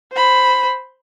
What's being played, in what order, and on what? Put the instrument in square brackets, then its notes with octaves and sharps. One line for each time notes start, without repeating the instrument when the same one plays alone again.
[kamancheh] C5 B5